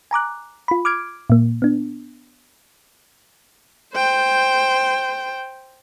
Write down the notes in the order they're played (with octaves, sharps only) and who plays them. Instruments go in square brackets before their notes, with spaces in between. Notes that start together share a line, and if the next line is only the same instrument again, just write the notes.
[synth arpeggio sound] G#5 A#5 D6 F#6
F4 B5
D6 F6 G#6 D7
A#2 A#3
B3 D4
[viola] C5 G5